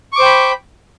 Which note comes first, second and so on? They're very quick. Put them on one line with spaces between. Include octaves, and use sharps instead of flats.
C#6 D6 C5 G5 B5